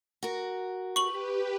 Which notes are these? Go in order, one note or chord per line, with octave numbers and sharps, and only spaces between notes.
F#4 A#4
G4 B4 C#6 F#7